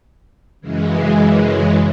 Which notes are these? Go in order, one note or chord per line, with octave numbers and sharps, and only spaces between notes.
F#2 C#3 E3 G#3